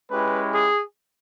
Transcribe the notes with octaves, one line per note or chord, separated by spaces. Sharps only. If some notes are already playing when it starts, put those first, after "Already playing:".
G#3 C#4 E4 G4 B4
G#4